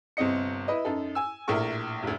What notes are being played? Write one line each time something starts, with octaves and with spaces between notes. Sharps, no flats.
G1 C3 C4 D#5 C#7
E4 B4 D#5
F#2 D#4 A4
G#5 E6
A#1 A2 A#4 C#6
F1 D2